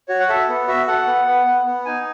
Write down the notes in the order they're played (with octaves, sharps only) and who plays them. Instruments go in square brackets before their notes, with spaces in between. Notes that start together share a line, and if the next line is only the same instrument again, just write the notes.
[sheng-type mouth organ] F#4 C#5
F#5
A4 E5
B3
F#4 E5
A4 F#5
B3
B3
B3
B3
D#4 G#5